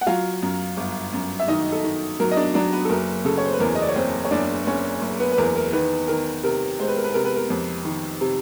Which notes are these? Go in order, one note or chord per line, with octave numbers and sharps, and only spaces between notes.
F#5
F#3 F4 F5
F#2
G1
F#2
E5
D#3 D#4 D#5
A4
D#3
F#3 A#4
D#5
D4 D5
F#3 D4 D5
B3 B4
A4
F#1 A#4
C#3 A4
C#5
C5
B4
E2 A#4
D#5
D5
C#5
F#1 C4 C5
C#5
F#1 D4 D5
F#1 C#4 C#5
F#1
B3 B4
B4
E2 A#4
A#4
D#3 B3 B4
D#3 A#4
C3 A#4
G#3 C5
B4
A#4
B3 B4
C3 A#4
B4
A#4
F2
D#3
C3